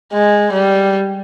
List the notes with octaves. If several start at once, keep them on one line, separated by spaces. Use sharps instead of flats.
G#3
G3